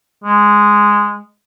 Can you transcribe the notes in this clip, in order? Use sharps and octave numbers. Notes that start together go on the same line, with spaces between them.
G#3